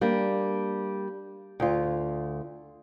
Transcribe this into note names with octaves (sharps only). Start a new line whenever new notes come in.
G3 A#3 D4
D2 F4